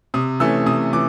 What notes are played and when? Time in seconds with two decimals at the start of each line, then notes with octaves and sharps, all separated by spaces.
0.14 C3 D#6
0.40 E3 A3 C#4 E6
0.66 C3 D#6
0.93 E3 D6